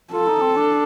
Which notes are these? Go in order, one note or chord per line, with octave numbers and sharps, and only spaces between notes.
F4 A4
D#4
C4
D4